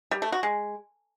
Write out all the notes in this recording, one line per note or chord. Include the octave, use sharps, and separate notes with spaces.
G3
A3
F#4
G#3